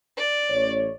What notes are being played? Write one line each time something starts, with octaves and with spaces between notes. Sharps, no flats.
D5
A1 C#5